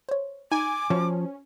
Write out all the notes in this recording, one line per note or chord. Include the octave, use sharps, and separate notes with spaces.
C5 C#5
D#4 G#5 A#5 D6
F3 C#4 F#4 E5 E6